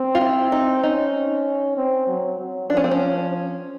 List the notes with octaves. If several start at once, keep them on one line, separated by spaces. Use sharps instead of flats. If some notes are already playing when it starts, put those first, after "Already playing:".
Already playing: C4
F4
E4
D#4
C#4 D#4
C4
F#3
F#3
F3 D4
C#4
C4
C#4